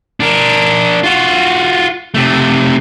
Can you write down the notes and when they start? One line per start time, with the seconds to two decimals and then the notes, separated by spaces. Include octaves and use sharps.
0.20 D4 A#4
1.03 F4 F#4
2.14 C3 A3